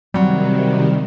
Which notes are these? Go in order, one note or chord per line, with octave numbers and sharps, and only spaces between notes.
C3 D#3 F#3 G3 C4 F#4